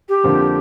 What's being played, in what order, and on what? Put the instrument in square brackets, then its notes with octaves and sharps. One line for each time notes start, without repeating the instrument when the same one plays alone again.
[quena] G4
[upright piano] F2 D3 F3 A#3